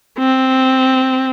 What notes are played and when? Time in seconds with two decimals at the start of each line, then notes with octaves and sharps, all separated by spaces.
0.18 C4